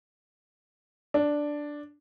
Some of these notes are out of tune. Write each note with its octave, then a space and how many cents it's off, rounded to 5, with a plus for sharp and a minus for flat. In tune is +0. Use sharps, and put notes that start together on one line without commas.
D4 +0